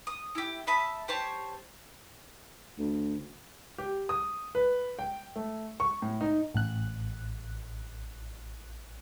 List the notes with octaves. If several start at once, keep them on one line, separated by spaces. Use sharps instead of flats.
D#6
E4 G4
E5 A5 B5 D#6
G4 C5 C#5 A5
D2
G4
D#6
B4
G5
A3
C#6
A2
D#4
A1 F#6